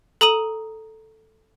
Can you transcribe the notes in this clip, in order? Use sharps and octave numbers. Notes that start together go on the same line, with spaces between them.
A4 A#5 D#6 D#7 F#7